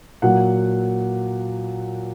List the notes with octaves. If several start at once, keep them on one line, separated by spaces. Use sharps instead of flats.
A#2 F#3 F#5